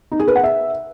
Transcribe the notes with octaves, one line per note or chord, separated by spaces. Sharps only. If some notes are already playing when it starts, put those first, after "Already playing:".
D#4
G#4
B4
F#5
E5